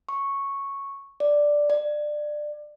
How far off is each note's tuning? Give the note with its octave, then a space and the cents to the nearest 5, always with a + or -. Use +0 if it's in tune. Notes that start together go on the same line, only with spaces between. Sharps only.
C#6 -5
D5 +0
D5 +20